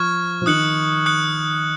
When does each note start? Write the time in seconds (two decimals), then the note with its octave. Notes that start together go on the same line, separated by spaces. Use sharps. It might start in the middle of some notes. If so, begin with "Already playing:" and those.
Already playing: F3 C#6 F6 G#6
0.42 F3
0.46 D#3 D#6 F#6 C#7 F#7
1.06 D#6 F#6 C#7 F#7